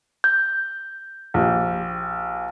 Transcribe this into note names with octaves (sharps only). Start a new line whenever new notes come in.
G6
A#1 G4